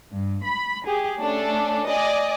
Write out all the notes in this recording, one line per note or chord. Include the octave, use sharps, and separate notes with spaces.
G2
B5
G4 G#4
A3 C#4 D4 A4
D5 D#5 G#5